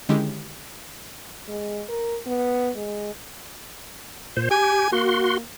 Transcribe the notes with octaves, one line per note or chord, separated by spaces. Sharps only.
D3 D#3 G#3 C#4 E4 G4
G#3
A#4
B3
G#3
A#2 C5
G4 G#5
A#3 F#4 C6